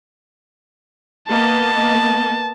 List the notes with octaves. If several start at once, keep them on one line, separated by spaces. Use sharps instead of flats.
A#3 B3 D#5 A5